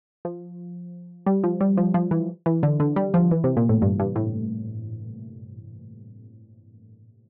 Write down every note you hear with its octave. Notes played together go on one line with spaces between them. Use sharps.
F3
G3
F3
G3
F3
F3
E3
E3
D3
D3
G3
F3
E3
C3
A#2
A2
G2
G2
A2